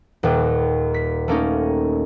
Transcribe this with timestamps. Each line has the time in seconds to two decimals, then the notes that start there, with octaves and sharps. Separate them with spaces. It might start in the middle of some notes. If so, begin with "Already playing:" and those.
0.23 D#1 D#2
0.94 B6
1.28 A3 A#3 C#4 D#4